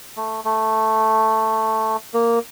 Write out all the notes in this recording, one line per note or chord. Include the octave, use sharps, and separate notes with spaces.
A3
A3
A#3